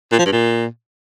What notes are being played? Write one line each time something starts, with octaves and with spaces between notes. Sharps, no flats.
A#2
F3
G2
A#2